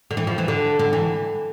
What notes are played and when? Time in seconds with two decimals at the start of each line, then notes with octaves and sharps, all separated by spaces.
0.11 D3
0.17 E3
0.27 F3
0.38 E3
0.48 D3
0.79 D3
0.93 E3